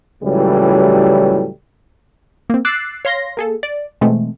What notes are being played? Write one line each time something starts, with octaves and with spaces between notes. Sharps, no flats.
C#2 A2 E3 F#3 G3
A#3 C4
D6 E6 F#6 A6 C7
C#5 F5 C6 A#6
A#3 G#4 A4
D5
B2 E3 G#3 A3 C4